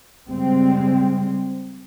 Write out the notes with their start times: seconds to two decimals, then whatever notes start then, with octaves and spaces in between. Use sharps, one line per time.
0.30 C#3 G3 G#3 C4